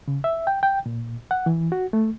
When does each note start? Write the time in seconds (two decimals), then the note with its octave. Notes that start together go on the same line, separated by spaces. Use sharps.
0.08 C#3
0.24 E5
0.47 G5
0.63 G5
0.86 A#2
1.31 F#5
1.46 E3
1.72 F#4
1.93 A3